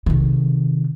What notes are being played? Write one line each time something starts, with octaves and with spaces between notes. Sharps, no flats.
C3 D#3